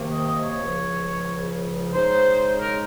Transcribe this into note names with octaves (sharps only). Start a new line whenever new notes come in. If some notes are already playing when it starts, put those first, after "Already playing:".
Already playing: C3 D#3 A#3
D#5
D#5
C#5
C#2 C#3 F3
C#3 G#3 D#4 C5
A#4